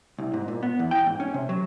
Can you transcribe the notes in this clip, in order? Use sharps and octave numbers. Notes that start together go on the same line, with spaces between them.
C2
G#2
A#2
B3
E2
G5
G#2
C#4
C3
F#3